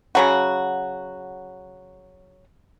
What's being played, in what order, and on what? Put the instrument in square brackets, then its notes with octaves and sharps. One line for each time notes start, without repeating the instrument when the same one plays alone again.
[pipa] C#3 F#3 F#4